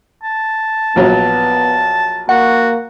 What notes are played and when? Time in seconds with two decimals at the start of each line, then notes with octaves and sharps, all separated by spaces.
0.23 A5
0.96 A#1 F#3 B3
2.29 A#3 F#4 F#5